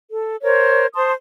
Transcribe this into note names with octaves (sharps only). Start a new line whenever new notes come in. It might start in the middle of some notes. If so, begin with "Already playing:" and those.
A4
A#4 C5 C#5
C5 A5 C6 D#6